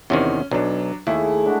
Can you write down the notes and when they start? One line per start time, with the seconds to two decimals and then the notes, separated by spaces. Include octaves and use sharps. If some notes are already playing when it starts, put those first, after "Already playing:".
0.10 E2 C3 D#3 C#4
0.51 B1 F#3 D4
1.07 D#2 A3 E4 G#4
1.44 G#3 D4 F#4